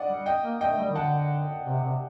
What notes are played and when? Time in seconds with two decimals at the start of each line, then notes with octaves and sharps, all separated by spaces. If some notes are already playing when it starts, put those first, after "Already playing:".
Already playing: D5 D#5 F#5
0.08 G3
0.26 D#5 G5
0.43 A#3
0.61 A3 D#5 G5
0.78 G3
0.90 D#3
0.96 D3 F#5 A5
1.66 C3
1.82 C3